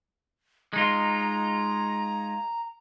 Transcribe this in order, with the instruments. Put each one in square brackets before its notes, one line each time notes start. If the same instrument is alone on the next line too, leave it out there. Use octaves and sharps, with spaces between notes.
[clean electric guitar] G#3 D#4 F4 [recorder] A#5